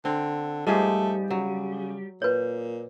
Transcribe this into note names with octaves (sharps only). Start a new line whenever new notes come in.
D3 C4
G#2 F3 G3 A3 G#4
C#3 F#3
A#2 B4 C#5